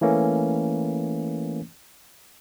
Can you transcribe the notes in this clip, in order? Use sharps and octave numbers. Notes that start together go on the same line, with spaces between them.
E3 A3 A#3 C#4